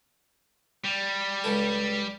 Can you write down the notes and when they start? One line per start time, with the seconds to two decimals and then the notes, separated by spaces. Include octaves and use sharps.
0.84 G3
1.44 C#2 A4